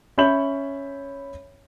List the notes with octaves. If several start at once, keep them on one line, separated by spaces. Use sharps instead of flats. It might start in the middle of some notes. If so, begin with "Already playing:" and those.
C#4 C#5 E5 B5 G6 F#7